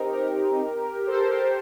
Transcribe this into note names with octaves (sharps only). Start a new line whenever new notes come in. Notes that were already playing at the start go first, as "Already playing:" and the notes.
Already playing: C4 D#4 G4 A#4
G4 A#4
A4 C5
G4 A#4